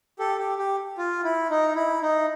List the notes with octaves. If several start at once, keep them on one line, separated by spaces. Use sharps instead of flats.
G4 A4
G4
G4
F4
E4
D#4
E4
D#4